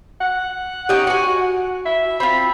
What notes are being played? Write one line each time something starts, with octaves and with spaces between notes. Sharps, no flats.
F#5
C#4 D#4 G4
F#4 G#5
E5
C4 F4 B5